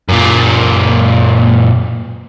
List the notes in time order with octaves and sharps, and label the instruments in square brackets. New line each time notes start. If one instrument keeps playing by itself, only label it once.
[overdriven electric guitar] F#2 A#2